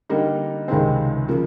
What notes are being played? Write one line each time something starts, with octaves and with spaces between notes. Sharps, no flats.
D3 G3 A#3 D#4
C#2 C3 D#3 G#3 C4
C#3 F3 A#3